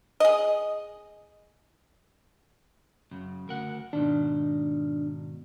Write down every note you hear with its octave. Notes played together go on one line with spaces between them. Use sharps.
G#4 D#5
F#2 C#3
D2 A#4 F#5
G#2 B2 D#3 D4